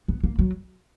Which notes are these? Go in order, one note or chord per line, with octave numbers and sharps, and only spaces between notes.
B3
A#3
F#3